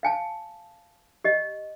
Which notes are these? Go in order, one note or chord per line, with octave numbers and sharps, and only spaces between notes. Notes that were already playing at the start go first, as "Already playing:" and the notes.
F5 G#5 A5
G4 D#5